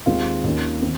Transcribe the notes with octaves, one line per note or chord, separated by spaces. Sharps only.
D#2 D#3 G#3 C4 F4
D#2 D#3 A#3 C#4
C4